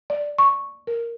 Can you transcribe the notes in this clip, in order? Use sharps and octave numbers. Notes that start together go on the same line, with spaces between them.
D5
C#6
A#4